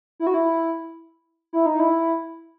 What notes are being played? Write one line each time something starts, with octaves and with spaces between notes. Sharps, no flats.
E4
F#4
E4
E4
D#4
E4